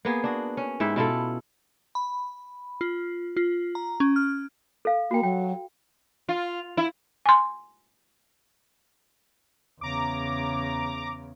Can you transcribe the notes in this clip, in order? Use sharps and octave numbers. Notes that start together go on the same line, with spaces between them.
A#3 B3 G#4
D4 F#4
C#4
G#2 E4 G4 E5
B2 E4 F4 A4
B5
F4
F4
A#5
C#4
F6
A4 F5
A#3 F#4 G5
F#3 G5
F4
E4
G#5 C6
E2 C#3 A#5 D6